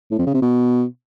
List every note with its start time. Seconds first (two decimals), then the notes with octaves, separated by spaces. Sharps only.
0.11 A2
0.19 F2
0.26 C#3
0.34 C3
0.42 B2